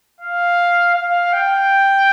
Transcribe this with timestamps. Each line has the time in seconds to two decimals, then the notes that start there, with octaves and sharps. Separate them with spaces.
0.21 F5
0.95 F5
1.33 G5